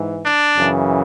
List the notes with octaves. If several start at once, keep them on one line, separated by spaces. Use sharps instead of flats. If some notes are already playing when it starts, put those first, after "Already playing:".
Already playing: G#2 E3
D4
F#2 C#3 E3